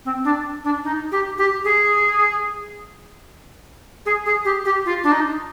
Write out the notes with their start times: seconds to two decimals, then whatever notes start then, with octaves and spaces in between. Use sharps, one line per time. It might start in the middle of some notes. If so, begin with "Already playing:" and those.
0.05 C4
0.24 D4
0.64 D4
0.84 D#4
1.12 G4
1.38 G4
1.65 G#4
4.06 G#4
4.26 G#4
4.45 G4
4.65 G4
4.86 F4
5.04 D4
5.12 D#4